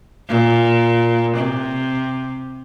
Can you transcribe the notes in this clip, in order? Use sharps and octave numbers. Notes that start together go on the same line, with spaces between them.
A#2
C3